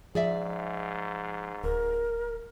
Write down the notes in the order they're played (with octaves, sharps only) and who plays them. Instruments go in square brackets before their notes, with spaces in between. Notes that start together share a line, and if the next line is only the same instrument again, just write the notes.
[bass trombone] G#2 [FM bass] F3 [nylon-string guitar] G#4 D5 E5
[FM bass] D1 [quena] A#4